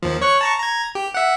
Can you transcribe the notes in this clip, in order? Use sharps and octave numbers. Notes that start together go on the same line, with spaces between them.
D#2 F3
C#5 C#6 F#6
A5 A#5 C#6
A#5 G#6
G4
E5 F#5